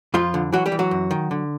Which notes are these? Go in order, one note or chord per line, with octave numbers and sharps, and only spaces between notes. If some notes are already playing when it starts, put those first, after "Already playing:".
F2 F3 F4
D3
E3 F#3 F#4
G3 G4
E3
F#3 F#4
F#2
D#3
D3